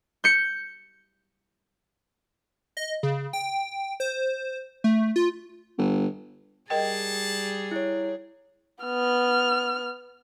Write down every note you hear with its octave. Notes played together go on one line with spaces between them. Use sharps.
G6 C#7
D#5
C#3
G5
C5
A3
F4
G1
G3 G#4 A#4 D#5 G5 A5
E4 C#5
B3 F6